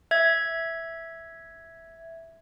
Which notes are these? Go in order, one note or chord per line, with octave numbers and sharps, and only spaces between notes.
E5 G#6